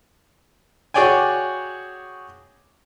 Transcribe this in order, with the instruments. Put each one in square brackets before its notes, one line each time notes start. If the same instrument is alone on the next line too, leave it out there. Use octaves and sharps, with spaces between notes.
[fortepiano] F#4 G#4 C#5 D5 G5 G#5